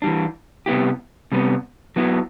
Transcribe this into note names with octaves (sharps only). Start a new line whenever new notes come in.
E3 G3 D4
C3 G3 B3 E4 G4
C3 G3 B3
F#3 B3 E4